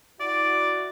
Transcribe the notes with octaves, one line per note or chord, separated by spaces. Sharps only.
E4 F#4 D5